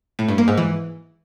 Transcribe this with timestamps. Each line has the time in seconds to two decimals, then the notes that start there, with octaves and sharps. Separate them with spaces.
0.19 A2
0.28 G2
0.38 A#3
0.48 G#2
0.57 E3